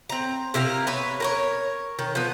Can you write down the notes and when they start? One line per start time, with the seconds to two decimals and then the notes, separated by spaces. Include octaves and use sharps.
0.09 C4 A#5
0.54 C3 E4 A#4 F5
0.87 B3 B4 C#5
1.20 A#4 B4 C#5
1.99 D#3
2.15 F3 B3